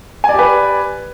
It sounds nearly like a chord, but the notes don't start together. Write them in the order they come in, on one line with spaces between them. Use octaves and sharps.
G#5 D5 G4 B4